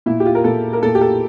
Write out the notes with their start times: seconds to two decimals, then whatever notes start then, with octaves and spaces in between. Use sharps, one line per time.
0.06 A#2 E4
0.20 G4
0.25 F4
0.35 A#4
0.44 A#2 A4
0.73 A#4
0.82 A#2 A4
0.95 G4
1.01 A4